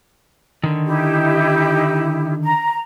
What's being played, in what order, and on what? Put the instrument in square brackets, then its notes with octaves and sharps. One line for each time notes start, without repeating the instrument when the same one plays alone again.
[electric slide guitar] D3 D#3
[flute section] D#4 E4 G4
A#5